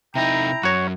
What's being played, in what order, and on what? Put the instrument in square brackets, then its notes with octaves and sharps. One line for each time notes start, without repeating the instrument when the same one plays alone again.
[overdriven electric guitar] C3 D#4 [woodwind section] E4 G5 A#5
[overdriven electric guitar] F#2 [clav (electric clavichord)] F#4 C#5